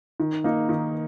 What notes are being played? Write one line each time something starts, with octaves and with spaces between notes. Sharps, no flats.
D#3
A#3 D#4
D#3